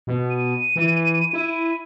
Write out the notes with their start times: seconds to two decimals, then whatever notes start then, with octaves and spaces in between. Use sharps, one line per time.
0.07 B2
0.30 D#7
0.76 E3
1.33 E4